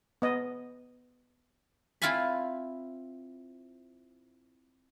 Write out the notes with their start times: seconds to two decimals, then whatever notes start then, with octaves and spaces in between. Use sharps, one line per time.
0.22 B3 D#5
2.02 C4 E4 F4 F5 G#5 B5